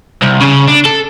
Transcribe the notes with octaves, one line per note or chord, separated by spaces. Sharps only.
C2
C#3
D4
A4